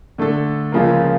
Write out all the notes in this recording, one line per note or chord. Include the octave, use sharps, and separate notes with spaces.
D3 A3 D4 A4
C#2 C#3 F3 A#3